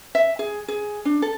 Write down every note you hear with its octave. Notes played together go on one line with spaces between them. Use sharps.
E5
G#4
G#4
D4
A4